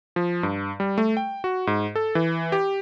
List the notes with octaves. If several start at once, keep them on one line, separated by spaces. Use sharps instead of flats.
F3
G2
G3
A3
G5
F#4
G#2
A4
E3
G4